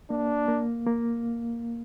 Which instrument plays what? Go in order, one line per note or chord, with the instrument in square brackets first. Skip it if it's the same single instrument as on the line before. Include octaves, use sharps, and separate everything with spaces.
[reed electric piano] A#3 [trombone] D4
[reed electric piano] A#3
A#3